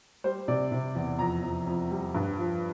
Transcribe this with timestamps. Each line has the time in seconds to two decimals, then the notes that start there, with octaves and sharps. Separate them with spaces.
0.24 G3 C5
0.48 C3 D5
0.71 C3
0.95 E2
1.19 F2 A#5
1.43 F2
1.67 F2
1.91 G3
2.15 G2
2.38 F3